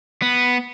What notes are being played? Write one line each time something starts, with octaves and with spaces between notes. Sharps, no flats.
B3